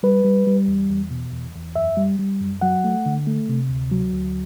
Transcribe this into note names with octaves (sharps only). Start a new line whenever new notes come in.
G3 B4
G3
G3
E2
E2
B2
E2
E2
F#2 E5
G3
G3
F#2
F#3 F#5
A3
D3
A3
C3
D2
F#3
D2